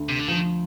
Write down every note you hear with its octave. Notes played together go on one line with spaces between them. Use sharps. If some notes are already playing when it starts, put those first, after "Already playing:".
Already playing: D2
C3
D3
D#3 F3